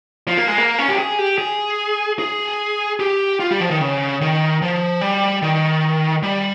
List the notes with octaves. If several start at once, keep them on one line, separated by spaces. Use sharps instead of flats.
F3
A#3
G#3
A#3
C#4
G4
G#4
G4
G#4
G#4
G4
F4
G3
F3
D#3
C#3
D#3
F3
G3
D#3
G3